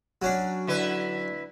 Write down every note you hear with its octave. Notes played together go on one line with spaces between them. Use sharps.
F#3 C#4 D4
D3 E4 B4